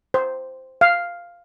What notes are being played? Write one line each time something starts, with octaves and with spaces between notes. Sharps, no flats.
C5
F5